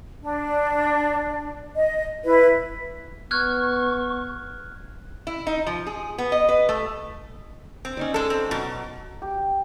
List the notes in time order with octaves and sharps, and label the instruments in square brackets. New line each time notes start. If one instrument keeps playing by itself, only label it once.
[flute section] D4
D#5
E4 B4
[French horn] B3 [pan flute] C#6 [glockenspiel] F6 F#6 G#6
[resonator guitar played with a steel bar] E4
D#4
F3
G#4
B3
D#5
B4
A3
C4
[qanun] C#4 D#4 D5
[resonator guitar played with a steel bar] G#3 A4
C4
[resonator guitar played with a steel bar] B2 [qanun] F#3 D6
[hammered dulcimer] G4